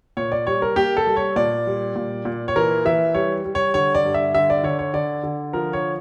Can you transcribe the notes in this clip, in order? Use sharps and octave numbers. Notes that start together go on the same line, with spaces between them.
A#2 C#5
D5
G3 C#5
A#4
A#3 G4
A4
G3
C#5
A#2 D5
G3
A#2
A#2
C#5
E3 A#4
E3 E5
G3 C#5
G3
C#5
D3 C#5
D5
G2
E5
D3 E5
D5
D3 C#5
C#5
D3 D5
D3
F3 A#4
C#5